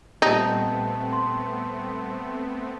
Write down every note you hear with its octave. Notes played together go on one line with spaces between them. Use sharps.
A#2 G3 A3 B3 C4 D#4 G5 A5
C6